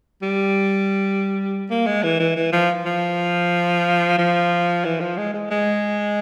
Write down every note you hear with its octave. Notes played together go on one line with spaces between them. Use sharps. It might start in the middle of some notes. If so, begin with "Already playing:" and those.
G3
A#3
G#3
E3
E3
E3
F3
F3
F3
E3
F3
G#3
G#3
G#3